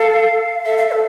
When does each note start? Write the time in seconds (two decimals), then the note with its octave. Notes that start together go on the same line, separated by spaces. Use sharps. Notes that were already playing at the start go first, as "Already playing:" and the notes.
Already playing: A4 F5
0.65 A4 E5
0.77 F5
0.83 E5
0.92 A4